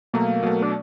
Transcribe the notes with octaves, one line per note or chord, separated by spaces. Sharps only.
B2 F#3 A3 A#3
B2 F#3 A3
D4